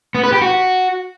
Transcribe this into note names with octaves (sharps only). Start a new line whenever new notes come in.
B3
B4
G4
F#4